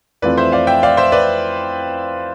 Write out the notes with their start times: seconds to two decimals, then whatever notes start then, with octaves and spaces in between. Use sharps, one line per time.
0.22 F2 E3 A3 C4 F4 B4 D5
0.38 C5 E5
0.52 D5 F5
0.67 E5 G5
0.83 D5 F5
0.97 C5 E5
1.12 B4 D5